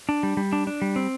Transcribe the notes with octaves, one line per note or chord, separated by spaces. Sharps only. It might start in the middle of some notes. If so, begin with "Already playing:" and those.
D4
G3
G3
D4
D4
G3
C4